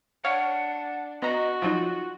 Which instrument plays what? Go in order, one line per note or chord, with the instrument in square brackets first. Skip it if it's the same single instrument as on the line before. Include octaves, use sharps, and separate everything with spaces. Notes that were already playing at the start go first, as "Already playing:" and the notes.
[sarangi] D4 [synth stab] C#5 F5 [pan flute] F#5
[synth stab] B3 A#5 [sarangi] F#4 [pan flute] D#5
[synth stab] F3 F#3 D#4 [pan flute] F4